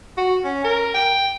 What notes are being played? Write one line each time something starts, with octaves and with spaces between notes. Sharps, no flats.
F#4
C#4
A#4
G5